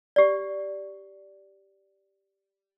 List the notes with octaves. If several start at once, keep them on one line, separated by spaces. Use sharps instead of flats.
G4 D5